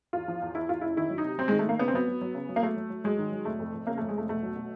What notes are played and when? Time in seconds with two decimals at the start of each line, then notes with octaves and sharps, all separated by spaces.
0.13 E2 F4
0.28 F3
0.42 E2
0.55 E2 E4
0.69 E2 F4
0.81 F#1 E4
0.97 D#3 E4
1.10 F#3
1.18 D#4
1.24 C3
1.38 F#3 C4
1.48 D#3 G#3
1.59 A3
1.65 D#3 A#3
1.79 C#3 B3
1.88 C4
1.93 F#3 B3
2.08 F#3
2.21 F#3
2.35 C#3
2.49 F#3
2.56 A#3
2.62 F#3 A3
2.77 F#3
2.90 F#3
3.04 F#3 G#3
3.19 D#3
3.32 F#3
3.45 F1 A3
3.59 F2
3.74 F2
3.87 C#3 A#3
3.98 F2 A3
4.09 G#3
4.16 F1 A3
4.29 B2 A3
4.43 F#3
4.56 B2